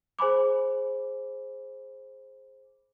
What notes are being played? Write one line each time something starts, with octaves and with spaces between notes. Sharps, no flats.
G#4 C5 G#5 B5 D6